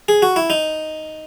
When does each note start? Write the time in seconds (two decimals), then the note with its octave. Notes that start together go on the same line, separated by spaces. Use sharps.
0.08 G#4
0.22 F#4
0.36 E4
0.50 D#4